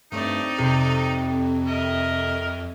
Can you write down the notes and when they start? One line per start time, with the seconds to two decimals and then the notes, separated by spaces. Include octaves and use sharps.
0.12 G2 A3 C4 D#4 D5
0.58 F2 C3
1.66 A#4 D#5 E5